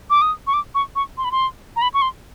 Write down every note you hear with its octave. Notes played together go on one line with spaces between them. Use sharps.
D6
D#6
C#6
D6
C#6
C#6
C6
B5
C6
A#5
B5
C#6
C6